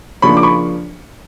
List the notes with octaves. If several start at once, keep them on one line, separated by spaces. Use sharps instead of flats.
C#3 F3 A#3 D4 B5 C#6
D6
B5 C#6